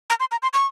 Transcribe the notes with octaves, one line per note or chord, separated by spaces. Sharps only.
A#5
C6
A#5
C6
C#6